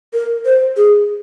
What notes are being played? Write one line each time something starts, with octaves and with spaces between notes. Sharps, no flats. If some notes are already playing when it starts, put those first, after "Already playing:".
A#4
C5
G#4